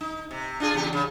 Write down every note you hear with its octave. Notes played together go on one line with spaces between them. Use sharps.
D#4
C3
D4 F4 G#4
E2 C#3 G4
C#3